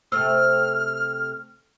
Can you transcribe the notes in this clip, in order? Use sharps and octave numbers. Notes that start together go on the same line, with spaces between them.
C3 A3 C5 E6 F6